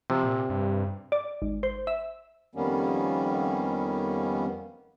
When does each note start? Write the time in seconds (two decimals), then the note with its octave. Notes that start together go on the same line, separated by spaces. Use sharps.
0.10 C3 F3
0.23 A#2
0.49 G2
1.12 D5
1.42 G#1
1.63 C5
1.87 E5
2.55 F2 D#3 G3 A#3 B3 C#4